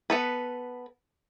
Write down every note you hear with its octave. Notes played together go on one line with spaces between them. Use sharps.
B3 A4 B4